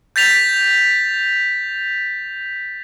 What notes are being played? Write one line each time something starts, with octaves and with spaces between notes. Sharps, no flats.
G6 A6 B6 F7